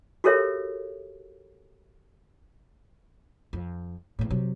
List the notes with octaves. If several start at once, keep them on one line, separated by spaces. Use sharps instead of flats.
F#4 G4 A4 A#4 C#5 E5
F2
E2 A2
C3 F#3